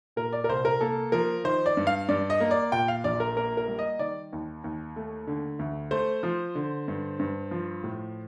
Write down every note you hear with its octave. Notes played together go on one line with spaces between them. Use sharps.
A#2 A#4
D5
A#4
C2 C5
A#4
A#3 A4
F3 A#4
D#3 C5
D5
G2
F5
G2 D5
D#5
A#3
D5
A#2 G5
F5
A#1 D5
A#4
A#3 A#4
A#4
G3
D#5
D#3 D5
D#2
D#2
A3
D3
D2
A3 C5
F3
D3
G2
G2
F3
A2